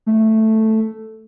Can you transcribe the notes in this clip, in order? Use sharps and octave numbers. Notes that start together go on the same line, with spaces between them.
A3